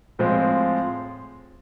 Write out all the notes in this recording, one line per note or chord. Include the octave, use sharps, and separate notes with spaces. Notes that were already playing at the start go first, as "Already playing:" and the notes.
A2 F3 G#3 C4